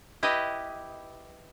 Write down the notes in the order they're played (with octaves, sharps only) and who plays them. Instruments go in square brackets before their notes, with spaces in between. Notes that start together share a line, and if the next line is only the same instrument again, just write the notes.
[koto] E4 G4 B4 D#5